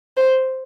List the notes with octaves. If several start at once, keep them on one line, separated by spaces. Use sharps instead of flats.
C5